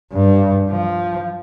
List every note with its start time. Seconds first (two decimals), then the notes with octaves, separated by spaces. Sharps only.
0.13 G2
0.69 F3